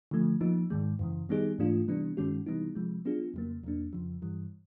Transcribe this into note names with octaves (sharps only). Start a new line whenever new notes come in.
D3 F3 A3
F3 A#3 D#4
G#2 D#3 G#3
F#2 C#3 E3
D#3 G3 B3 D#4 G#4
G#2 E3 A3 D4 F4
C3 E3 G3 B3 D4
G2 D#3 G#3 C#4 F#4
C3 E3 G3 B3 D#4
C3 F3 G#3
F#3 B3 D4 F4 G#4
F2 C#3 F#3 A#3
E2 B2 F#3 A#3 D4
F2 C#3 F3
G2 E3 G3